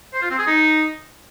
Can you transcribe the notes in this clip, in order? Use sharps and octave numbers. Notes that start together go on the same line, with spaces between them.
C5
F4
C4
G#4
D#4